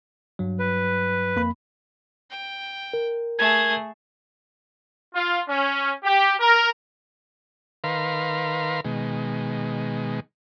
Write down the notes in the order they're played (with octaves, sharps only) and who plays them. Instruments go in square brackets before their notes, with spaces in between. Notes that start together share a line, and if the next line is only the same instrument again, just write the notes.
[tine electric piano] G2 F#3
[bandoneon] B4
[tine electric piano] F2 A#3 B5
[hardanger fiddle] G5
[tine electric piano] A#4
[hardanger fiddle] A3 G#4 [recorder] G#6
[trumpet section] F4
C#4
G4
A#4
[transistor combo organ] D#3 A#4 B4 F5 C6
B2 D#3 G#3